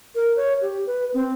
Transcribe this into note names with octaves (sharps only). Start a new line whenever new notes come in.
A#4
C#5
G4
B4
C4